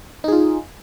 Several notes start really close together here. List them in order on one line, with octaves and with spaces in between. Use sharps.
D#4 G#4 F4